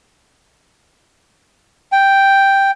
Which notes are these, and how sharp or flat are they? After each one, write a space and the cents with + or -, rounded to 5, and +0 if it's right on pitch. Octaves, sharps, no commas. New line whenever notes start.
G5 +0